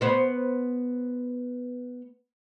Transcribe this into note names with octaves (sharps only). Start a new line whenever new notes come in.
B3 C5 C#5